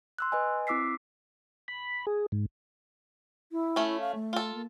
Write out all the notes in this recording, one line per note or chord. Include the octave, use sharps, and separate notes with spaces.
C6 E6 F#6
B4 D#5 G#5
C4 E4 D6 E6 B6 C7
B5
G#4
G#2
E4
A3 C#4
F5
A3
F4 A4
A#3